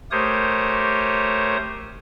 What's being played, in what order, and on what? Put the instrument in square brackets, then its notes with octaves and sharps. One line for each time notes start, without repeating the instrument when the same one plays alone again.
[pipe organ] A3 G4 A#4 C5 C#5 D#6